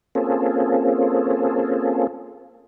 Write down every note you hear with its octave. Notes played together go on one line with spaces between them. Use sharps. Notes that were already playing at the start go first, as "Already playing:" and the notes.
A#3 C4 C#4 F4 G#4 A4